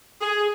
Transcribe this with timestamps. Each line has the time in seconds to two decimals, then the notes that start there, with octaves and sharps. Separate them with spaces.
0.21 G#4